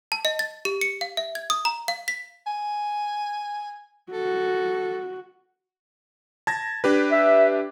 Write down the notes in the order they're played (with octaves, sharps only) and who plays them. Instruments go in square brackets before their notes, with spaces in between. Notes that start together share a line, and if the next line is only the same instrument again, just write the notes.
[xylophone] A5
D#5
A6
G4
C#7
F5
E5
G#6
D#6
A#5
F5
B6
[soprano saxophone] G#5
[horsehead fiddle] F#4 [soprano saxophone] A4
[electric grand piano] A5 G#6 A#6
D4 G4 B4
[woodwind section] E5